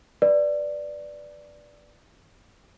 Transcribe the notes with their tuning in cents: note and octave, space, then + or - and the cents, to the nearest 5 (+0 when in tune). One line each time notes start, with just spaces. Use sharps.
B4 +0 D5 +0